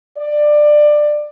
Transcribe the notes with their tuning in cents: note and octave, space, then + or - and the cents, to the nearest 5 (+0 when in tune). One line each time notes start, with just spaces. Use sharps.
D5 +20